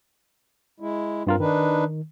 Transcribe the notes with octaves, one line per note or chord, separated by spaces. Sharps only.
G#3 E4
G2 C4 F4 A#4
D#3 D4 D#4 B4